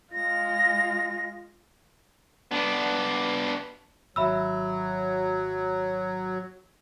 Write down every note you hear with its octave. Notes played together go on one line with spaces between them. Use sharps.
G#3 F4 A#6
B3 D4
G#1 F#3 E5 B5 E6